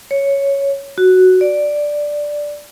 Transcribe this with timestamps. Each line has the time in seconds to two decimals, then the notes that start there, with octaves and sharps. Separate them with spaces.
0.11 C#5
0.98 F#4
1.41 D5